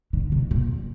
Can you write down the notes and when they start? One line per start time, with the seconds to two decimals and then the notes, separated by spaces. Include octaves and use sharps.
0.13 D3
0.32 C3
0.51 A#2